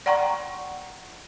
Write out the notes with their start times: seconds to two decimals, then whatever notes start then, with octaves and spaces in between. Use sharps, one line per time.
0.06 D5 F#5 G5 A#5 C6 C#6